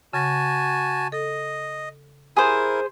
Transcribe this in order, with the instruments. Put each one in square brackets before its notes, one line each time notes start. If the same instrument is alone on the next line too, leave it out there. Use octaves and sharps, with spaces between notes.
[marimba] C#3 A#6 [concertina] F#4 G#5 A5
[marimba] A4 [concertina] D#5
[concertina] E4 A#4 [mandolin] G#4 C5